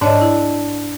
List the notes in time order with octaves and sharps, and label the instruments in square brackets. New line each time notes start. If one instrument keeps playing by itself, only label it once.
[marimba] G#2 C#5 D#5 [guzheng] D4
[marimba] E4